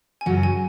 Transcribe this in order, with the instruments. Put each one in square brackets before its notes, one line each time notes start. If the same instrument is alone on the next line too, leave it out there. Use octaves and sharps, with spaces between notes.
[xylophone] G#5
[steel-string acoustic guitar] F#2 C#3 F#3 C#4 [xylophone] F#5
[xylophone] G#5